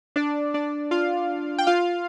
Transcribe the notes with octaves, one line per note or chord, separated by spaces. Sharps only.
D4 D5
D4 D5
F4 F5
G5
F4 F5